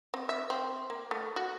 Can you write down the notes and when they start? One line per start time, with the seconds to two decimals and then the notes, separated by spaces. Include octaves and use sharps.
0.14 C4
0.29 E5
0.50 C4
0.90 A#3
1.11 A3
1.36 F#4